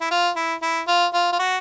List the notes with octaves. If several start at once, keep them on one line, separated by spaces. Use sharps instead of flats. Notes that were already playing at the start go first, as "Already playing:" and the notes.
E4
F4
E4
E4
F4
F4
F4
F#4